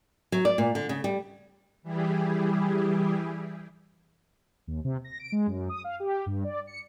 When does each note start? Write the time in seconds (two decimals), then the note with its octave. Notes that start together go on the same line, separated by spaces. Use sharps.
0.32 F#3
0.45 D5
0.58 A#2
0.75 D3
0.89 C#3
1.04 G3
1.83 E3 G3 E4 G4 G#4
4.67 D#2
4.84 C3
5.04 A#6
5.20 D7
5.32 G#3
5.47 F#2
5.69 D#6
5.84 F5
6.00 G4
6.26 G2
6.44 D5
6.67 C#7